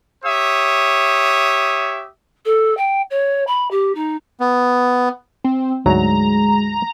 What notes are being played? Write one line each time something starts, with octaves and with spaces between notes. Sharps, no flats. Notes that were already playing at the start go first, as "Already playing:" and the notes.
G4 C#5 E5 D#6
A4
G5
C#5
B5
G4
D#4
B3
C4
D2 G#2 F#3 G#3 A#5